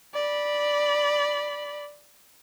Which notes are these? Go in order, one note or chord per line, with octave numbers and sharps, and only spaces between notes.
D5 B5